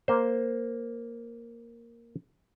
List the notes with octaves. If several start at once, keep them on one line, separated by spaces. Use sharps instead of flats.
A#3 C5